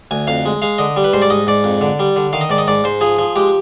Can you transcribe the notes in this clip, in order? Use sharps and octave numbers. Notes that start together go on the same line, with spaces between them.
D2 G#5
F2 F5
G#3
G#3 F5
D3 D#5
G3
B4
G#2 C5
D5
G#2 D#5
G#2 D5
F2
D3
G3
D3
D#3 F5
D#5
G#2 D5
D#5
G#2 D5
G#2 C5
F3 G#4
F3
G#3 G4